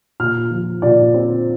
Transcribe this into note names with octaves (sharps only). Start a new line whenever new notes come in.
A#2 F6
F3
A#2 D5
C4